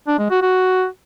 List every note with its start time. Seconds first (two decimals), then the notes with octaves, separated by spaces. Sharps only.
0.07 D4
0.19 G#3
0.30 F#4
0.42 F#4